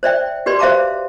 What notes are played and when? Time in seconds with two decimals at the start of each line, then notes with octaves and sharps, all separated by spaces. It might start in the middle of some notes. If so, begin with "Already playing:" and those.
0.03 C5 D5 E5 G5
0.46 F#4 G4 B4 D5 C6
0.59 C5 E5 F5 A#5 D6